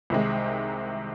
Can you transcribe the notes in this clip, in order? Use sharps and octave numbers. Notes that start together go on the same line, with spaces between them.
C2 C3 D#3 G#3